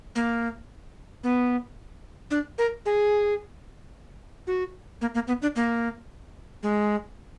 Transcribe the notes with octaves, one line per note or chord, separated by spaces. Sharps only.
A#3
B3
D4
A#4
G#4
F#4
A#3
A#3
B3
D4
A#3
G#3